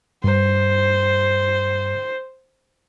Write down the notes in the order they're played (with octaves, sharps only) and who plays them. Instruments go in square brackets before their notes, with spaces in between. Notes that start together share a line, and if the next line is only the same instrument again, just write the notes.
[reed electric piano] G2 [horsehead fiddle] C5